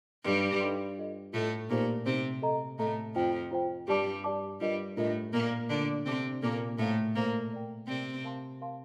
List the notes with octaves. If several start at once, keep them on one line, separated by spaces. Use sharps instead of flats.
G2 G3 D#4 A4 D#5 G5 C6
D#4 A4 D#5 G5 C6
F4 A4 D#5
A2 A3 F4 A4 D#5
A#2 A#3 D#4 G4 C5
C3 C4 D#4 G4 C5
A4 D#5 A#5
A2 A3 A4 D#5 A#5
F2 F3 F4 C5 G5
F4 C5 G5
G2 G3 G4 D5 A5 D6
G4 D5 A5 D6
G2 G3 D4 F4 A#4 D#5
A2 A3 D4 F4 A#4 D#5
A#2 A#3 F4 A#4 D5
D3 D4 F4 A#4 D5
C3 C4 A4 D5 A5 D6
A#2 A#3 A4 D5 A5 D6
A2 A3 A4 C5 F5 A#5
A#2 A#3 A4 C5 F5 A#5
A#4 D5 G5
C3 C4 A#4 D5 G5
A#4 F5 A5 C6
A#4 F5 A5 C6